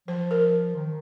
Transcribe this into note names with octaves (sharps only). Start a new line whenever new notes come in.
F3 C5
A#4
D#3